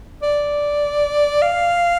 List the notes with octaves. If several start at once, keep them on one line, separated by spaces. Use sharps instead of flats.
D5
F5